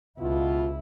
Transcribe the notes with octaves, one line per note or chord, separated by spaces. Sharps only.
C#2 B2 E4 F4